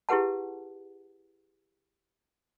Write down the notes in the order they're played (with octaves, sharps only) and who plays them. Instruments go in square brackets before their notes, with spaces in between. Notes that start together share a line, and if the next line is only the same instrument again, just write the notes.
[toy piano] E4 G4 G#4 B4 F#5 A5